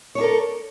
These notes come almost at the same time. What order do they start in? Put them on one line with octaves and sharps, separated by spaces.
C#5 D4 A#4 A4